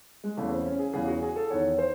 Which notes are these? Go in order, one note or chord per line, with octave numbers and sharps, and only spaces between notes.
G#3
E2 C#3 E3 A3
C4
C#4
G#4
E2 C#3 E3 G#4
F#4
G#4
A4
E2 D#3 C#5
C5